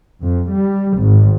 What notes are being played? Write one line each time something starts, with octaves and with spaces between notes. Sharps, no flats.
F2
G3
G#1